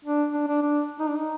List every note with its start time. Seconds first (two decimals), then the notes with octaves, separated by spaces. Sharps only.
0.05 D4
0.33 D4
0.47 D4
0.62 D4
1.00 D#4
1.09 D4
1.18 D#4